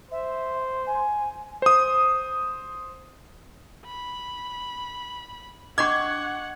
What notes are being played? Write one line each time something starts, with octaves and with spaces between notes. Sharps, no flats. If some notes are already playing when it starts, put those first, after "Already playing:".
C5 E5
G#5
C5 D#6
B5
D4 D#5 F#5 C#6 D6 G#6